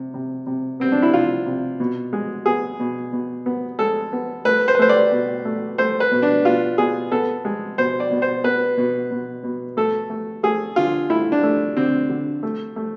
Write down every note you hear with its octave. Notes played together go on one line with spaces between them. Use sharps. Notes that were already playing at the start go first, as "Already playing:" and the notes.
Already playing: C3
C3
C3
B3 C4
D4
E4
C3 F4
C3
B2
G#3
B3 G#4
B2
B2
B3
G#3 A4
B3
A3 B4
C5
B4
A3 C5
D5
B2
A3
A3 C5
B4
B2
D4
B2 F4
B2 G#4
B3 A4
G#3
B2 C5
D5
B2
C5
B3 B4
B2
B2
B2
A3 A4
A3
A3 G#4
D3 F4
A3 E4
D4
A3
D3 C4
D3
A3
A3